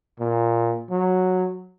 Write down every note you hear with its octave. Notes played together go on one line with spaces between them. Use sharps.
A#2
F#3